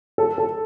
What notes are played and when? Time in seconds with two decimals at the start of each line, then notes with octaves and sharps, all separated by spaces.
0.18 A4
0.38 A4